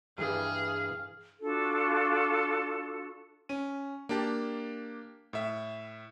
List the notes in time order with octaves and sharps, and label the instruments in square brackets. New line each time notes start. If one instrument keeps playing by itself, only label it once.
[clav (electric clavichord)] G2 E3 G3 [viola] G#4 [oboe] F5
[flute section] D4 F4 F#4 A4
[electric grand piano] C#4 D#7
A#3 D4 G4 A5
A2 E5